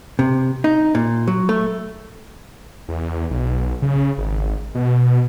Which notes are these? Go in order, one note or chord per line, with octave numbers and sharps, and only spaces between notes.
C3
D#4
A#2
F#3
A3
E2
B1
C#3
G#1
B2